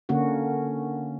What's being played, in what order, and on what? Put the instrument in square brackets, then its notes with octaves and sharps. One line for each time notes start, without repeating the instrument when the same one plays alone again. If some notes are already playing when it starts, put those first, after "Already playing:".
[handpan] D3 A#3 C#4 F#4